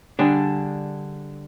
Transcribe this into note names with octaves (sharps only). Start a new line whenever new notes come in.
D3 G3 D4 G#4